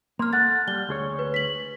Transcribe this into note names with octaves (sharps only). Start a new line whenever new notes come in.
A#3 C6 F6
A4 F#5 A6
G3 G7
D2 G#4 C#5
B4
B6 F#7